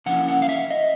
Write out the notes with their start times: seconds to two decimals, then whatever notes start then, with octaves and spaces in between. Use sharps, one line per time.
0.06 D3 F3 A#3 C#4 E4 F#5
0.28 F#5
0.42 F5
0.49 E5
0.71 D#5